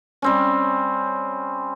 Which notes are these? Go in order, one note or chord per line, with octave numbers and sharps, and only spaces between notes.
G3 C4 C#4